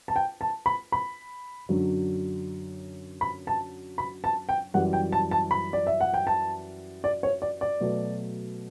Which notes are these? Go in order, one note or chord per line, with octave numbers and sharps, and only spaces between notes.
A5
G5
A5
B5
B5
F#2 D3 F#3
B5
A5
B5
A5
G5
F#2 E3 G3 F#5
G5
A5
A5
B5
D5
E5
F#5
G5
A5
D5
C#5
D5
D5
B2 F#3 A3